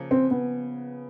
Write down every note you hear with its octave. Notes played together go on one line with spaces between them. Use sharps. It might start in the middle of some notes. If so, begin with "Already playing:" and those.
Already playing: C#3 F3 A#3
C4
B3